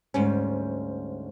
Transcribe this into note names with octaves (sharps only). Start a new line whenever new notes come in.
D2 G#2 G3 C#4